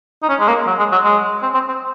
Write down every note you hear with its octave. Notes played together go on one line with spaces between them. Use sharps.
D#4
C#4
G#3
A#3
F#3
G#3
F#3
G#3
C4
C4
C4